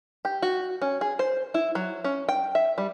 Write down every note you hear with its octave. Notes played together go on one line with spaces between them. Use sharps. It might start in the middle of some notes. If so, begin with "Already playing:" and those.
G4
F#4
C#4
G#4
C5
E4
F#3
C#4
G5
E5
G3